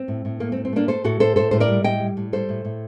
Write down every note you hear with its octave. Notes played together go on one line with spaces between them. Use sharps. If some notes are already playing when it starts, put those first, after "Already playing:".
Already playing: C4
A2
A2
A3 A#3
C4
A2
C4
A3 A#3 D4
A3 A4 C5
A2 F#4 A4
A2 A4 C5
A2 A4 C5
A2 C5
A#4 D5
G3
A2 D#5 G5
G3
A2
G3 A4 C5
A2
A2